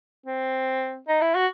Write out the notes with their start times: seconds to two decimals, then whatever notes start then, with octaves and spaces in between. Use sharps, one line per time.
0.26 C4
1.08 D#4
1.22 E4
1.35 F#4